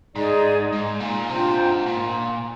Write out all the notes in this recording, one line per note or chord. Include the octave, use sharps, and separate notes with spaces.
G#2 D#4 G#4 D5
G#2
A#2
C3 D4 F4 C5 G5
G#2
A#2